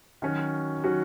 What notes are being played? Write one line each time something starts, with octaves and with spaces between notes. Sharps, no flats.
D#3 F#3 C#4 F#4
D#3 F#3 C#4 F#4